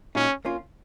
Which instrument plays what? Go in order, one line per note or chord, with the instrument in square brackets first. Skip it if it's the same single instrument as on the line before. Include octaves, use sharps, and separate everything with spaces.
[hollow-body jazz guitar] A#2 G#3 D#4 F#4 [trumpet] C#4
[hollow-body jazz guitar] A#3 C#4 F4